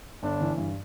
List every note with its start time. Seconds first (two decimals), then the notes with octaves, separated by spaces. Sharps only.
0.23 G1 D4
0.41 E3
0.58 G2